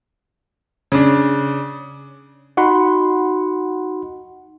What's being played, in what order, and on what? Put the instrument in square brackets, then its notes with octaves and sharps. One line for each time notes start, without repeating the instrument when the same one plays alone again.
[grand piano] C#3 D4
[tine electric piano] D#4 F#4 F#5 B5 C6